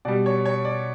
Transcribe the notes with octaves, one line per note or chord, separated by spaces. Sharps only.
B2 G3 D5
C#5
C#5
D5